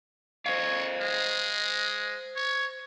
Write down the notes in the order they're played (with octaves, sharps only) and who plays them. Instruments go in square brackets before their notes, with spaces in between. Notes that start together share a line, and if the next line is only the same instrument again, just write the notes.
[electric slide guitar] C5 D#5 F5 [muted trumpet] C#5
[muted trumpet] G#3
C#5